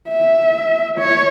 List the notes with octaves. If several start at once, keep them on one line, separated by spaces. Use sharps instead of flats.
E5
C#5